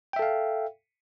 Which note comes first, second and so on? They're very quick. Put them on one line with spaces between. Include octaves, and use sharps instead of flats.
G5 E5 A4 F5